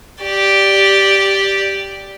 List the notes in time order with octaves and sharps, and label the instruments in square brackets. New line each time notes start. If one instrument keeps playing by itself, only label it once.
[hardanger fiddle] G4 D5